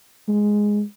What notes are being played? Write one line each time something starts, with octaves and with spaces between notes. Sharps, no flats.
G#3